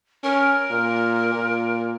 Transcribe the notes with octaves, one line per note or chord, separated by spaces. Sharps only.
C#4 A#4
A#2
A#2